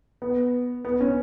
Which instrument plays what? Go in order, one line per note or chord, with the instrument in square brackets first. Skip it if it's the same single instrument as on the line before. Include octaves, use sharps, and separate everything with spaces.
[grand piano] B3
B3
C#4